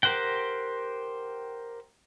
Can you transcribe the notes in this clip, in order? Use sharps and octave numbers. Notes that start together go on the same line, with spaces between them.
G4 A#4 C5 F#5 G5